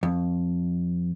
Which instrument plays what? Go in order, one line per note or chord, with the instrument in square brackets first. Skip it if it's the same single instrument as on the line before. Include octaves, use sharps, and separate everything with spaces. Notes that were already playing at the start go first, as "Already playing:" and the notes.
[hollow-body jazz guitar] F2